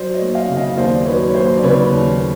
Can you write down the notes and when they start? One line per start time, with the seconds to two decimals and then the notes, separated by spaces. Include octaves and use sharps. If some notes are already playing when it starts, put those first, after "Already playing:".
Already playing: F#3 C5 D5
0.14 C#5 D#5
0.21 A#3
0.35 D#5 F5
0.50 C#3
0.56 D#5 F5
0.77 D#2 C5 D5
1.06 F#3 B4 C#5
1.29 C#5
1.35 A#3 C5
1.57 D5
1.63 C#3 B4 C#5
1.92 D#2